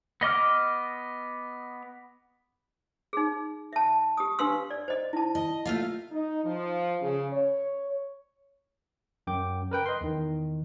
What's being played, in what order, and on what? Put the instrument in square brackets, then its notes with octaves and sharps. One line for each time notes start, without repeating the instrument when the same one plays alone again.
[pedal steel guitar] B3 D#5 D6 F6
[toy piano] D#4 G#4
E5 A5
G4 D#6
D4 G4 B4 F5 C6 E6
D5
C5 D#5
E4 A5
[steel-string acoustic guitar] D#5
[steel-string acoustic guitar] A3 F4 F5 [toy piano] D#5
[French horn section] D#4
F3
C#3
C#5
[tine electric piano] F#2 G5 D6
A#4 B4 G5
D#5 C6
E2 D#3